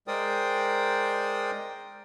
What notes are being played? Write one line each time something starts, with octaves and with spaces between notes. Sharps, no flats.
G#3 A#4 C5 D5 G5 D#6